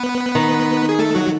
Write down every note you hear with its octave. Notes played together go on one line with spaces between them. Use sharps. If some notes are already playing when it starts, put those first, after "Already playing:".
Already playing: B3 B4
D#3
G#4
A3 A4
F#3 F#4